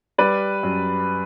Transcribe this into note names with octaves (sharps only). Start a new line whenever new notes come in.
G3 B4 D5
F#2